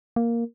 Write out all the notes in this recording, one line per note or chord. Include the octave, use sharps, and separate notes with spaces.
A#3